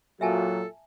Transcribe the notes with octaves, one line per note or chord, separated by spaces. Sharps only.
A#2 F#3 F#4 A4 E5 G#5 A5